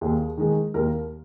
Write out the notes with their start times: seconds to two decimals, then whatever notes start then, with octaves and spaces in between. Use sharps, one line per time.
0.01 D#2 G#4
0.38 D#3 G#3
0.74 D#2 A#4